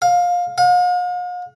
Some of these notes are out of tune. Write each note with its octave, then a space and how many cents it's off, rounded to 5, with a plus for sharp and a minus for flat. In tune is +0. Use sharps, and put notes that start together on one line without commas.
F5 +20
F5 +45